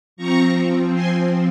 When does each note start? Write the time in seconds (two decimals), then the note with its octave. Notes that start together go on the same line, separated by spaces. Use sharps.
0.16 F3 C4 A#5 C#6
0.93 G#5 C6